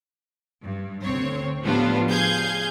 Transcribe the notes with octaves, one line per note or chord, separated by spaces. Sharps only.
G2
D2 C4 C#5
A2 F3 G3 B3 D4 F4
G#4 F5 G6 G#6